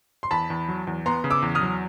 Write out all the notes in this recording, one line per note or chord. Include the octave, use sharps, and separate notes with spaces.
C6
E2 A5 B5
E2
F#3
E2
B3 A#5 C6
C#3
D6 E6
E2
D#6 F6
F#3